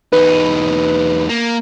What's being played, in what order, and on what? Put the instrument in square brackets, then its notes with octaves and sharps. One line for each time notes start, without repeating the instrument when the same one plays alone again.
[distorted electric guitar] E2 D#4 [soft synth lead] B4
[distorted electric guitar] A#3